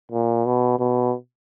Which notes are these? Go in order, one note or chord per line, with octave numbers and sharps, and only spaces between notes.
A#2
B2
B2